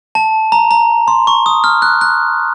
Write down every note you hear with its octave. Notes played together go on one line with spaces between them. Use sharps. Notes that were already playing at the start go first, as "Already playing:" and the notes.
A5
A#5
A#5
C6
C#6
D#6
F6
F#6
F#6